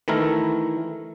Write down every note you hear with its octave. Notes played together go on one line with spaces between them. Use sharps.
D#3 E3 A3 E4 A#4